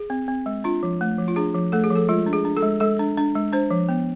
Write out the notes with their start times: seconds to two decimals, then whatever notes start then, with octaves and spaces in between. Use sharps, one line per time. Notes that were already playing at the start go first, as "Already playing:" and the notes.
Already playing: G#4
0.10 C4
0.28 C4
0.46 G#3
0.64 D4 F4
0.83 F3
1.01 A3
1.19 F3
1.28 F4
1.36 D4 G#4
1.55 F3
1.72 A3 A4
1.84 G#4
1.90 F3
1.96 A4
2.09 G#3 F4
2.26 D4
2.33 G#4
2.45 D4
2.57 A4
2.62 G#3
2.80 G#3 A4
2.99 D4
3.17 D4
3.35 G#3
3.53 D4 C5
3.71 F3
3.89 B3